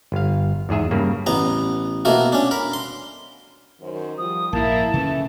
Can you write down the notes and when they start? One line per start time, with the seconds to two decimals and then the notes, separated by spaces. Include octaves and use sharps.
0.12 G1 F5
0.69 E2 G#2 G#4 E5
0.91 G2 C#3 A#3
1.26 A1 B3 A#5
2.05 B2 A3 A#3 F#4
2.32 C#4 D4
2.51 A#4 B5
2.73 C6
3.81 F#2 D#3 C5
4.18 F3 G3 D#6
4.53 A#1 G#2 A#3 E4 A5
4.94 C#3 E3 A3 C#4